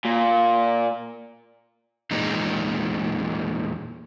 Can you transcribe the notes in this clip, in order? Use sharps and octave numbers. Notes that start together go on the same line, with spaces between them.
A#2
E2 A#2 G#3 D#4